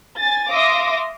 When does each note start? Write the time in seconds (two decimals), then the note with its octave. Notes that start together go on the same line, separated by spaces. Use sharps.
0.20 G#5 A6
0.52 E5 F5 C6 D6 D#6 A#6